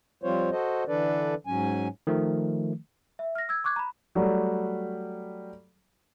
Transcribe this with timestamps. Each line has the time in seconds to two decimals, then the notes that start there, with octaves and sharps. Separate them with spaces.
0.23 F3 G3 C4 F4 C5 C#5
0.52 F#4 A4 C5 D#5
0.88 D3 E3 D4 A4 B4 D5
1.47 G#2 F#3 C#4 G#5
2.07 D#3 F3 A3
3.19 E5
3.35 F6 A#6
3.49 E6 G#6
3.64 C#6 D6 F#6 G#6
3.76 A#5 B5
4.15 F#3 G3 A3